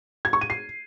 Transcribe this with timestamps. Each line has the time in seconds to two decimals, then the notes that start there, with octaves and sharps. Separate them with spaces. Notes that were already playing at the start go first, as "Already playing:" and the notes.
0.25 G#6
0.33 C#6
0.41 D#7
0.50 C7